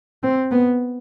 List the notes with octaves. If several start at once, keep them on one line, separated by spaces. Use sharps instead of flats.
C4
B3